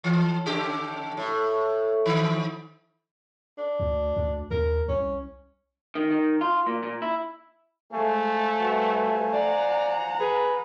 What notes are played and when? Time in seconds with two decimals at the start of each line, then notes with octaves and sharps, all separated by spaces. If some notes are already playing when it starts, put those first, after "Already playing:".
0.04 E3
0.46 C#3 G4
1.17 A2
2.06 D#3
3.58 D4
3.80 D2
4.16 D2
4.51 D#2 A#4
4.88 C2 C#4
5.95 D#3
6.11 D#3
6.41 F4
6.66 A#2
6.83 A#2
7.02 E4
7.92 G#3 A3 C5 F5 G#5
8.60 G3 F#4 B4
9.33 D5 F#5 A#5
10.20 G#4 B4